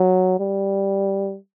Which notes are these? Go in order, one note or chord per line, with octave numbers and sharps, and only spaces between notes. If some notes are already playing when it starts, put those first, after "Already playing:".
Already playing: F#3
G3